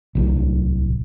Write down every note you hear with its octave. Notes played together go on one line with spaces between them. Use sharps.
D1 C2 F#3